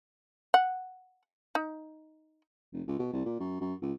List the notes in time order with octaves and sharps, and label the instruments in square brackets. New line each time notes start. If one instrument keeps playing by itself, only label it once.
[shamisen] F#5
D#4
[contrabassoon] F1
C#2
B2
C2
A#2
F#2
F#2
C#2